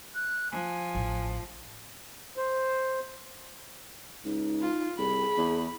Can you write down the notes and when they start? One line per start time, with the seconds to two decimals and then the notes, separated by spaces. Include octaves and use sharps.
0.15 F#6
0.51 F3 G#5
0.95 A1
2.37 C5
4.25 C#2 D#4
4.61 F4
4.98 C2 G#4 B5
5.38 E2